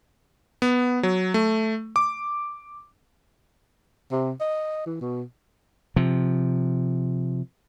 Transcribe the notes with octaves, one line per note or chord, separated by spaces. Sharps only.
B3
F#3
A3
D6
C3
D#5
E3
B2
C3 F3